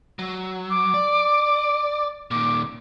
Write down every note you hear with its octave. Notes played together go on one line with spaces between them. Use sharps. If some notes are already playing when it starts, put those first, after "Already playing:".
F#3
D6
D5
A#2 D#3 D6